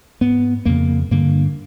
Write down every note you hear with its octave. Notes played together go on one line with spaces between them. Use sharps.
G#2 B3
F2 C#3 A#3
G2 D3 A#3